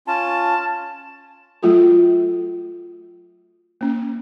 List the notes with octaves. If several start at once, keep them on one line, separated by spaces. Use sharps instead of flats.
C#4 F4 A5
F#3 A3 F4 F#4 A4
A#3 C#4